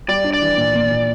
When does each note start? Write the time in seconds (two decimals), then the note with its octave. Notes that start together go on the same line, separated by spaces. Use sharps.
0.08 G3 D5
0.24 D4
0.34 D5
0.42 E3
0.57 A#2
0.75 A#2
0.91 A#2